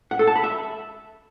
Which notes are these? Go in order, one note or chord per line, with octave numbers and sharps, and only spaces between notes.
F#5
A4
A5
B5
E5